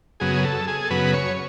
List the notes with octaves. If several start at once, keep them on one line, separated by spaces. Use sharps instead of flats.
F#2 C#3 F#3 B3 G#4
A4
G#4
A4
F#2 C#3 F#3 B3 B4
C#5